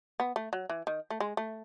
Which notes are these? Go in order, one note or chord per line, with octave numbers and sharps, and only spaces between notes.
B3
A3
F#3
E3
D#3
A3
G#3
A3